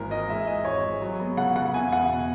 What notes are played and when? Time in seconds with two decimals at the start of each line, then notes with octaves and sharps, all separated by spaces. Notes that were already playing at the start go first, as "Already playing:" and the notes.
Already playing: G#1 E3 A#3 A#4
0.11 E3 D#5
0.29 G#3 E5
0.47 E3 D#5
0.65 G#1 C#5
0.83 G#3
1.02 F#3
1.19 B3
1.37 C#3 F#5
1.55 C#3 F#5
1.74 E2 G#5
1.92 E2 F#5
2.10 B2